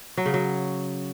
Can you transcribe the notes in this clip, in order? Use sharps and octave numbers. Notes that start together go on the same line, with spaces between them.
F#3
C#3
F#3